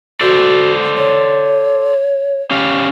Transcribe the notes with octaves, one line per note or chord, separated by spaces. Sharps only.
F#4 A4 C5 D5
C#5
C#4 G4 F5